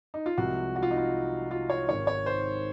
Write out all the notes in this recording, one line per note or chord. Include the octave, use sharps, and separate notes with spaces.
D#4
F4
C2 C3 F3 G#3 F#4
F#4
F4
D#4
F4
F4
C#5
G#1 G#2 D#3 C#5
C#5
C5